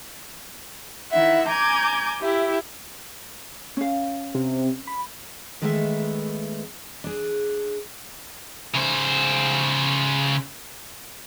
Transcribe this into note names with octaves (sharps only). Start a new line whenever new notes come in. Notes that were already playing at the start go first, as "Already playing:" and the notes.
D#3 E4 E5 F#5
G#5 A#5 D6 G6 G#6
E4 G4 E5
C#4 F5
C3
B5
D#3 G#3 A3 B3 A#4 E5
D4 G#4
C#3 C5